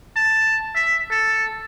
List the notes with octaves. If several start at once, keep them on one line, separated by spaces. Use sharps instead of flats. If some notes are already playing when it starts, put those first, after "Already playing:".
A5
E5
A4